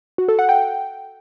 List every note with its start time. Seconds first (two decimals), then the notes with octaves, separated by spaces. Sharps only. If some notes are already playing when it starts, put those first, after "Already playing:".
0.18 F#4
0.28 A4
0.39 F#5
0.49 G5